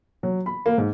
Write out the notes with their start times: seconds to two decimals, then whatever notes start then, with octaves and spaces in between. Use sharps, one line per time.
0.23 F#3
0.46 B5
0.66 A#3
0.78 G#2